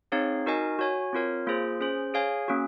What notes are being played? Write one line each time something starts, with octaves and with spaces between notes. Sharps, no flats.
C4 D#4 G#4 C#5 F5
D#4 F#4 A#4 D#5 G#5
F#4 C#5 G#5
C4 F4 A#4 C#5
A#3 F4 G#4 C5
C#4 G#4 C5
G#4 C#5 F5 G#5
A#3 C#4 F#4